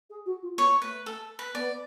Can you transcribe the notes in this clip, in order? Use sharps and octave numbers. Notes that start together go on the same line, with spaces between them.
G#4
F#4
F4
B3 C#5
A3 B4
A4
B4
B3 D5